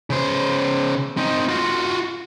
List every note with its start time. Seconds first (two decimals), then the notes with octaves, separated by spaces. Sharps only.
0.10 C#3 C5
1.17 C4 D#4
1.48 F4 F#4